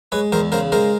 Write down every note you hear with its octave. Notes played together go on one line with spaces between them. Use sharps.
G#3 B4 C#5
E2 A#4 C5
C#3 A#4 C5
G#3 A#4 C5